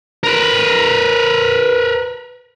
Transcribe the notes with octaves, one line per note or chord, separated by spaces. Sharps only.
A#4 B4